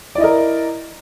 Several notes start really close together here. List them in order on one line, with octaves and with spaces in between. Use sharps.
D5 E4 D#5 A#4